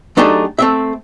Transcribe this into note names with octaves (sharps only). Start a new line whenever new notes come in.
F#3 A3 D4 D#4 G4 G#4
A3 C4 E5